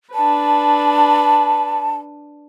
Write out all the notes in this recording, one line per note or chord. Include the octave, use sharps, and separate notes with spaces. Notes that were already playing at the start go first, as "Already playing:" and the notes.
D4 B4 A5